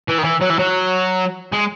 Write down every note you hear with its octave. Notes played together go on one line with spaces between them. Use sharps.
E3
D#3
E3
F#3
E3
F#3
G#3